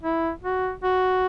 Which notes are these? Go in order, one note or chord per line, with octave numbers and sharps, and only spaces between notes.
E4
F#4
F#4